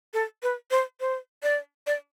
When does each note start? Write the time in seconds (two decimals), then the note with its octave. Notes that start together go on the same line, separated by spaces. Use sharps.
0.14 A4
0.43 B4
0.71 C5
1.00 C5
1.43 D5
1.87 D5